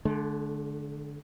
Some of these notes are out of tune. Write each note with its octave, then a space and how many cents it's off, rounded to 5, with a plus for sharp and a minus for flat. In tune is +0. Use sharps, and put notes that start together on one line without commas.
D3 +0 A3 -45